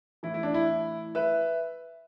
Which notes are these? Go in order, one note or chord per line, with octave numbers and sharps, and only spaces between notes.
A2 E3 E4
E4
D4
E4
B4 E5